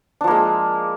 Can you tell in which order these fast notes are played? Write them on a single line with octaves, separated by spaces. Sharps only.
D4 F3 A#3 G#3